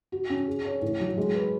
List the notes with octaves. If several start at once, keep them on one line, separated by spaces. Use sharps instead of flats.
F#4
C#4
G#4
C#5
A2
F#3
G#3
B4